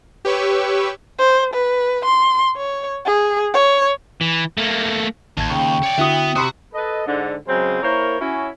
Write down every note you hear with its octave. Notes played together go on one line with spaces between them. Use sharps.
G4 B4 C#5 C#6 E6
C5
B4
C6
C#5
G#4
C#5
E3
A3 A#3
A1 D#2 A5 G#6
C#3 G5 C#6
C#5 D5
D3 B3 E4 F#4 D#6
C3 F#4 B5 C6 D#6
A4 B4 D#5
G#2 D3
C#3 F#3 G#3 C4 C5
A#3 E4 A#4 C5 C#5
C#4 E4 F#4